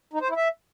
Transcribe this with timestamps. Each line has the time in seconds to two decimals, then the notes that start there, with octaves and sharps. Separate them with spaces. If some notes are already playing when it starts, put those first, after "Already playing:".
0.13 D#4
0.21 C5
0.29 E4
0.37 E5